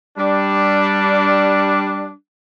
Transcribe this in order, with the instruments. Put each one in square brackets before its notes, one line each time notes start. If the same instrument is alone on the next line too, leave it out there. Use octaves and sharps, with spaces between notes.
[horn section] G3 D4